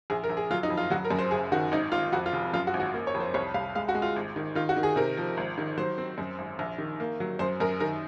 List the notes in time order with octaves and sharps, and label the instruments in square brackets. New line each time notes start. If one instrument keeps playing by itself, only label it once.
[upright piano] A#1 G#4
A#4
A#1
G#4
F#3 F4
D#4
F2
F4
F#3 F#4
A#4
F#2
C5
F#1 G#4
D#3 F#4
G#1 D#4
G#1 F4
F2 F#4
F4
F1
F#2 F4
F#4
G#1
F#4
A#3
C#5
F2
C5
C2 C#5
C2 F5
G#3 F5
F#4
G#3
F4
G#1
D#3
D#3 F4
F#4
D#3
G#4
C3 A#4
F3
G#1
D#3
F#3 C5
C4
F#2
G#1
A#1
D#3
A#3
F#3
F#2 C5
F#2 A#4
D#3 A#4